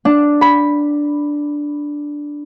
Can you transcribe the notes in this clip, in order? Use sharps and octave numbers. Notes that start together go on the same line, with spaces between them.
D4
B5